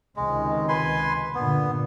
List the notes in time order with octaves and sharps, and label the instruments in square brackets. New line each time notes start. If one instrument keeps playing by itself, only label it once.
[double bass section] C#2 C3 D#3 [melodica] G#3
[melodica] B4 G#5 C6
[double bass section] G2 A#2 D3 [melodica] B3